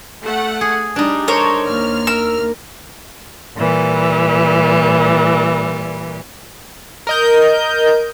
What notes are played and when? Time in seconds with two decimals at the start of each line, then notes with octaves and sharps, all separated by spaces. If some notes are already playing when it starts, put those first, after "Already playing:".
0.22 A3 F#5
0.61 G#4
0.96 G3 D4 D#4
1.28 A4 A#4 C5 C#5 A#5
1.66 D#2 F6
2.07 A#4 E6
3.57 A#2 E3 G3
7.07 A#4 D#5 G6